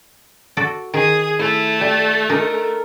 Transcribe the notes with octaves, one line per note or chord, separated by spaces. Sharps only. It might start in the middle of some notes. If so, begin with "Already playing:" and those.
F#4 A4 D5
D#3 G#4 D#6
A3 E4
G4 D5
D4 D#4 A4 A#4